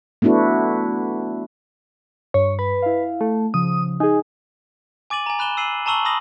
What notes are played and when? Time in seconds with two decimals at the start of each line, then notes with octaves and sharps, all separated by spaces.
0.22 A3 B3 D4 E4 F#4
2.34 G2 C#5
2.59 B4
2.82 E4 F5
3.21 A3
3.54 C#3 F3 D#6
4.00 D#4 G#4 G#5
5.10 G#5 D6 A6 D#7 F#7
5.26 G#5 A#5
5.39 B5 F#6 E7 G7
5.57 E6 C7 D#7 F#7
5.86 A5 A#5 C#6 E6 F#7 G7
6.05 B5 D#6 E6 A#6 F#7 G7